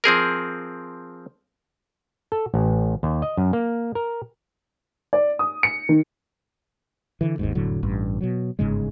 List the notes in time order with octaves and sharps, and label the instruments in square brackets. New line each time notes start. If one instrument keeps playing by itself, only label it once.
[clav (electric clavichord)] F3 C4 G#4 A#4
A4
A1
D#2
D#5
F#2
A#3
A#4
[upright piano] D5
D#6
C#7
D#3
[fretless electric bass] D3 E3
G#1 D#2 G#2
F1 A2 D3 F#3
A1 G2
B2 F#3
G1 G#2 C#3 G#3